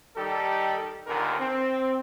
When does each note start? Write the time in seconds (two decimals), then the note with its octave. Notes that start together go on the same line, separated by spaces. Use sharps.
0.17 D#3 G3 D#4 G4 A4
1.07 D#2 A#2 D3 D#3 B3 A#4
1.40 C4